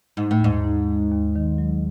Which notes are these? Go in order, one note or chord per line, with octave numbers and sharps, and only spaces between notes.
G#2 D#4
A2
D#2 G#2
D#4
D#2
D#2
D#3
F#3